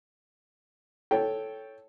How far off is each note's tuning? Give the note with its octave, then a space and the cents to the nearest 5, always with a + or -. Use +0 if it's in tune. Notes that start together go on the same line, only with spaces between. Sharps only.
A4 -10 C#5 +0 G5 +0